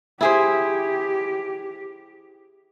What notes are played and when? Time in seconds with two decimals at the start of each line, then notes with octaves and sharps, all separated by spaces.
0.21 E4 G4 G#4 C5